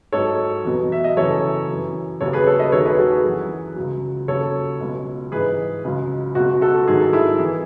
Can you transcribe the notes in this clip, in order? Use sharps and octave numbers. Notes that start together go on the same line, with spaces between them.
G#2 F#3 A4 C#5
E2 B2 F#3
E5
D#5
F#2 C#3 E3 A4 C#5
F#2 E3
D#2 C#3 F#3 A4 C#5
G#4 B4
A4 C#5
B4 D#5
D#2 D#3 F#3 A4 C#5
G#4 B4
F#4 A4
G#4 B4
F#2 E3
C#2 C#3 F#3
D#2 C#3 F#3 A4 C#5
C#2 B2 F#3
G#2 E3 G#4 B4
C#2 C#3 F#3
C#2 B2 F#3 F#4
F#4 A4
G#2 D#3 F#3 G#4
A4
E4 G#4
E3